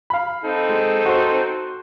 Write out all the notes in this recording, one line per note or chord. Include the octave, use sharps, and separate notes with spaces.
F5 B5
C4 D#4 A4
G#3
F#4 C5